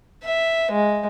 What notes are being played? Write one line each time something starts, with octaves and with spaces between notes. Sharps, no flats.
E5
G#3